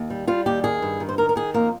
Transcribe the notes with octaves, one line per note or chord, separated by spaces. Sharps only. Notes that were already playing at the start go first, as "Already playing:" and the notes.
Already playing: D#2
G3
G3 F4
D#2 G4
D#3 G#4
G2
D#3
C5
D#3 A#4
A#4
D#3 G#4
F2 A#3